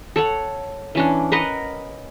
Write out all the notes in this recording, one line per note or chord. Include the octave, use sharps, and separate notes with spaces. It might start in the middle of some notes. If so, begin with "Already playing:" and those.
A4 C#5 F#5
E3 C#4 D4
A#4 B4 D#5 F#5